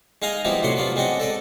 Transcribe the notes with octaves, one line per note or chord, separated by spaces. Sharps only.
G#3 D#4 F5 G#5 A#5
F3 G3 B3 D#4 E4
A2 C3 F#3 F#5 C6
F#3 B3 D4 F4
G#3 C4 D4 D#5 F#5
A4 D5 D#5